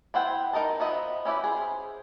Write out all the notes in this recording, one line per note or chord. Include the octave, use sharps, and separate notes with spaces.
B3 E4 C5 F#5 G5
D#4 A#4 D#5 A5
F3 B3 D#5 E5
C#4 E4 G4 B4
G#4 C5